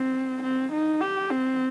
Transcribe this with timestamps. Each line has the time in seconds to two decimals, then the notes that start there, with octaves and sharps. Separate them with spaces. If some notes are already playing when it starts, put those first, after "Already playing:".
Already playing: C4
0.43 C4
0.72 D#4
1.01 G4
1.30 C4